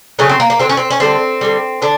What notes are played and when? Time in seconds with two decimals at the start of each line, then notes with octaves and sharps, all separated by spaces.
0.19 C#3 F#3 A3 C#4
0.29 C4
0.40 A#3
0.50 A#3
0.59 D3 G3 C4
0.69 C#4
0.77 C4
0.90 C#4
1.00 D3 G3 C4
1.41 D3 G3
1.82 D3 D4